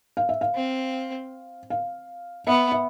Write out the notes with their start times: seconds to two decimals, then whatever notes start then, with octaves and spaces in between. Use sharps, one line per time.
0.17 F5
0.29 E5
0.41 F5
0.54 C4
1.70 F5
2.46 B3 E5
2.72 E5